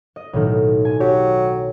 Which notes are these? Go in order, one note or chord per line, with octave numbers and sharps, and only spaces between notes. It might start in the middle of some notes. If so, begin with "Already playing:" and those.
D#5
B1 A2 D#3
G#5
F#3 G4